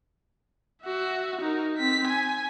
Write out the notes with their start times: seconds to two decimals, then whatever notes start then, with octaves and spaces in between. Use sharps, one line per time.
0.83 F#4 E5
1.41 D#4 A#4
1.77 C4 B6
2.07 G#5